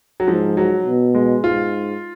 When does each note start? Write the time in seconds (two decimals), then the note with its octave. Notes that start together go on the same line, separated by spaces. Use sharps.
0.20 F#3
0.28 G#2 F3
0.57 F#3
0.86 B2
1.15 G#3
1.44 G#2 F4